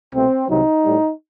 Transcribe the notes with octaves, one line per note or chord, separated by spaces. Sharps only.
C2 B2 A3 C4
C2 C3 D#3 F#3 D#4
A2 G3